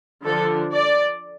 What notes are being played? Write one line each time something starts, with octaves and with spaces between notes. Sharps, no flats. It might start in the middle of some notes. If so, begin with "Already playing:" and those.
D3 F3 D4 A4
D5